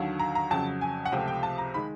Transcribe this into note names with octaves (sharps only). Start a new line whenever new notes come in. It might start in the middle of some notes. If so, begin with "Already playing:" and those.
Already playing: D#2 D3 F#3
A#5
A#5
F2 C#3 F#3 A5
G#5
F#5
C#2 C3 F3 A3 G5
G5
A5
A#5
D#3 G#3 B5